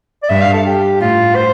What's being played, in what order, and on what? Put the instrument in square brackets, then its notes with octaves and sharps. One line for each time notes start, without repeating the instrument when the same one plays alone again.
[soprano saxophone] D5
[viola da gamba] G2 [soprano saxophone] E5
[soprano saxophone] F5
A4
G4
[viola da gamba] A2 [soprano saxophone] F4
[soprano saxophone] C5